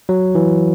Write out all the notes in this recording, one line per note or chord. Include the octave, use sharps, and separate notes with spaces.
F#3
E3